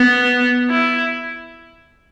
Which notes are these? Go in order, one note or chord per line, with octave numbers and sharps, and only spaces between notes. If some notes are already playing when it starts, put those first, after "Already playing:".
Already playing: B3
E4